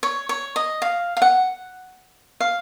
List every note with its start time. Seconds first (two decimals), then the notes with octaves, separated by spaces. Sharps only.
0.03 C#5
0.29 C#5
0.56 D#5
0.82 F5
1.17 F5
1.22 F#5
2.40 F5